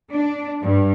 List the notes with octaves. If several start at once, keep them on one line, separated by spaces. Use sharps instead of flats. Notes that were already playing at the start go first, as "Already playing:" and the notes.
D4
G2